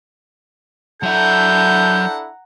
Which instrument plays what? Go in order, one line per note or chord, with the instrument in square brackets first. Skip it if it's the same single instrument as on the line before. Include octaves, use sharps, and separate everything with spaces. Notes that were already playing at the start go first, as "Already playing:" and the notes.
[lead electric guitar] F#3 E5 [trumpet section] D4 E4 A4 [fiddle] F#5 A#5 [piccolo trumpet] G6